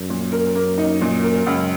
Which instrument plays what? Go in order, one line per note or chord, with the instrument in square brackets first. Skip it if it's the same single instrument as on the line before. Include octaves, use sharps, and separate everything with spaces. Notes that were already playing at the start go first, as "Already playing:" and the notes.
Already playing: [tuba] F#2
[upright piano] A#2
A#4
A#3
D#4
A#2
A#4
[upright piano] C#2 [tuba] F#2